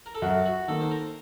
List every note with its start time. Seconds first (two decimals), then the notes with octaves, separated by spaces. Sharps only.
0.06 A#4
0.15 A4
0.22 F#2 F#4
0.45 F#4
0.68 D#3 A#3 A4
0.81 C5
0.91 A#4